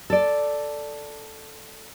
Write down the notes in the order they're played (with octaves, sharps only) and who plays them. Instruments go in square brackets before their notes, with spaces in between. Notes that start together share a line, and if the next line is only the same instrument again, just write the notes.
[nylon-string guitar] A4 D5